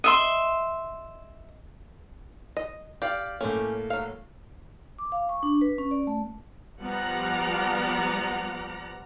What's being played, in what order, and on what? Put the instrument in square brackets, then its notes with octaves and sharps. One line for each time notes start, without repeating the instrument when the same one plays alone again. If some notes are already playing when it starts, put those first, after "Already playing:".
[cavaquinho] D#5 E5 C6
[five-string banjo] D#5
[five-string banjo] G4 [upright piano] D5 F5
[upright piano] A2 A3 A#3 [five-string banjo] C#4 G4
[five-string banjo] F#3 F5
[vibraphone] D6
F5
C#6
D4
B4
C#4
D5
A3
[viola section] F3 G3 B3 D5 F#5 A#5